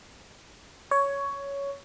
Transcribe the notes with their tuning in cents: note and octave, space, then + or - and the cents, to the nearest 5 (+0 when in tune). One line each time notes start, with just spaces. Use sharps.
C#5 +10